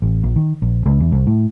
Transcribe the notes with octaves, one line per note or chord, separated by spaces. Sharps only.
A1
A#1
D#3
A#1
C#2
E2
C2
A2